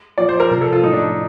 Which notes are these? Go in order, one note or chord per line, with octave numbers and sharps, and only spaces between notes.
A#2 F3 D5
C5
A#4
C3 F3
A4
F4
A2 F3 D#4
D4
D#4